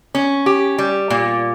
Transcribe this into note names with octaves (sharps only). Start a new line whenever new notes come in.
C#4
G4
G3
A#2